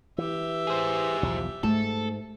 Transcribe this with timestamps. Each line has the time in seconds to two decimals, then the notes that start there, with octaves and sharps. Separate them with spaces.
0.18 E3 G4 E5
0.67 G#4 C5
1.23 B1 E2 F3
1.63 G#2 A3 A4